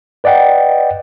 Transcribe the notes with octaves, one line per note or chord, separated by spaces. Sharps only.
B4 D5 D#5 F#5 G5